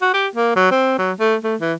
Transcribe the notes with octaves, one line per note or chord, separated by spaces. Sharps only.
F#4
G4
A#3
F#3
C4
F#3
A3
A3
E3